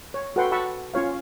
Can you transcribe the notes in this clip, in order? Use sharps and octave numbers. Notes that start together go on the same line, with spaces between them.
C#5
F#4 A4 B4 F#5 G5 C6
F#4 F#5 A5 B5 C#6 E6
C#4 F4 C#5 F5